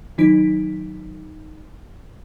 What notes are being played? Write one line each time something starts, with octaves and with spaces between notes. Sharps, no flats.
D#3 F#3 D#4 B6 D7